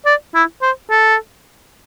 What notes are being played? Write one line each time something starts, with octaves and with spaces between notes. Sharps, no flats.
D5
E4
C5
A4